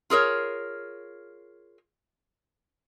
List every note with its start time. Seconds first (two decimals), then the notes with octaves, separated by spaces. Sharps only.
0.10 F4 G#4 A#4 C#5